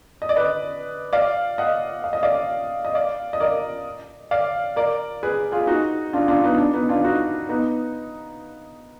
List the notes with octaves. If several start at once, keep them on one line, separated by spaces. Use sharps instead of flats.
D#5
D5
B4 D#5
D5 F5
D#5 F#5
F5
D#5
D5 F5
D#5
D5 F5
D#5
A#4 D5
D5 F5
A#4 D5
G#4 B4
F4 G#4
D#4 F#4
D4 F4
D4 F4
B3 D#4
D4
B3 D#4
D4 F4
D#4 F#4
B3 D#4